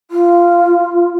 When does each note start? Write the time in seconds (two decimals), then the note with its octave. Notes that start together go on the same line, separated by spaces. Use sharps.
0.11 F4